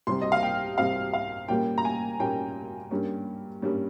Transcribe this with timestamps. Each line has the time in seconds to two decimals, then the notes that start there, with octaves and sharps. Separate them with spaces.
0.07 C2 C3 G3 C4 C6
0.22 D#5
0.32 F5
0.43 G5
0.78 C2 C3 G3 C4 F5
1.13 F5
1.48 A#2 G3 A#3 C#4 G5
1.78 A#5
1.85 G#5
2.19 A#2 G3 A#3 C#4 G5
2.91 G2 G3 A#3 C#4
3.62 G2 G3 A#3 C#4